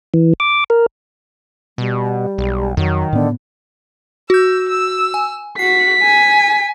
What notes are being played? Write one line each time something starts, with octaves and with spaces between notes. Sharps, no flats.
E3
D6
A#4
B2 G3
B1
F2 D#3 F#3
A2 D3 B3
F#4 E6 G6
E6
G#5
F#4 B6 C7
G#5